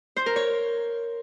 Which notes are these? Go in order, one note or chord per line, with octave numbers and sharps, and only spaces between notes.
C5
A#4
C#5